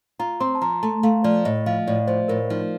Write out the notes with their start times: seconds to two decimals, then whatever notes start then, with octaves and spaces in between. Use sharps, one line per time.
0.19 F4 A#5
0.40 C4 C6
0.55 A5
0.61 F3 A#5
0.83 A3 A5
1.03 A3 F5
1.24 F3 D5
1.45 A2 D#5
1.66 F3 F5
1.87 A2 D5
2.07 F3 C5
2.28 A2 A#4
2.50 F3 D#4